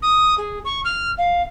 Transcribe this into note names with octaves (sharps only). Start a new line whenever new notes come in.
D#6
G#4
C#6
F6
F5